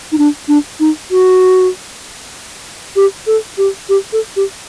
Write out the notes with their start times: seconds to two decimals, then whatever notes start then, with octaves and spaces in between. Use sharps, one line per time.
0.12 D#4
0.18 D4
0.48 D4
0.80 D#4
1.11 F#4
2.96 G4
3.27 A4
3.58 G4
3.89 G4
4.13 A4
4.36 G4